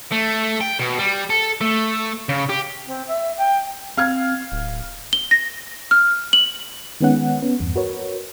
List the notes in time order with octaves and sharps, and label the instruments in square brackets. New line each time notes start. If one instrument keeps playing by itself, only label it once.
[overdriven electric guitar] A3
G5
B2
G3
A4
A3
C#3
G4
[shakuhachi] C4
E5
G5
[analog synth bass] C4 [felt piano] F5 F6 G#6
[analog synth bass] D1
[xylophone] G7
A#6
F6
F#7
[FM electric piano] D#3 G#3 B3 C#4 F#5
B3 C#4
E2 G2
F#4 A#4 B4 C#5